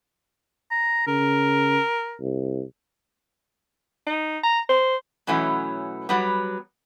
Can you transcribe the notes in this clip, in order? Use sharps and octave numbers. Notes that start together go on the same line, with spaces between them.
A#5
C#3 A#4
C2
D#4
A#5
C5
B2 E3 F#3 A3 C#4
F#3 G3 B3